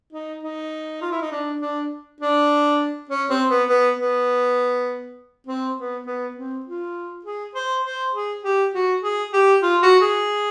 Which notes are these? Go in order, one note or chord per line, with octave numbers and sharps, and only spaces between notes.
D#4
D#4
F4
E4
D#4
D4
D4
D4
C#4
C4
B3
B3
B3
C4
B3
B3
C4
F4
G#4
C5
C5
G#4
G4
F#4
G#4
G4
F4
F#4
G#4